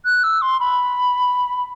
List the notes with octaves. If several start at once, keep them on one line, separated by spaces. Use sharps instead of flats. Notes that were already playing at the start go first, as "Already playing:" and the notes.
F#6
E6
C6
B5